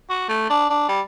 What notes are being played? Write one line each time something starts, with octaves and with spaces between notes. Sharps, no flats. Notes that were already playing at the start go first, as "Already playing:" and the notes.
F#4
A3
D4
D4
G3